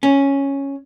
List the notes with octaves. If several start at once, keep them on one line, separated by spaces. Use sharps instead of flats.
C#4